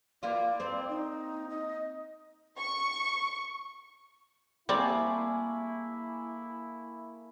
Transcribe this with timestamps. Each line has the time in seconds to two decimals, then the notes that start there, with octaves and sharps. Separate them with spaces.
0.23 A#3 E4 F4 D5
0.60 A#3 C4
0.89 D#4
1.50 D#5
2.57 C#6
4.69 G3 A3 A#3 C4 E4 G#4 D5